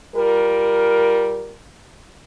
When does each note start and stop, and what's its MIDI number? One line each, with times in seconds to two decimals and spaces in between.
0.15 1.56 55
0.15 1.56 65
0.15 1.56 70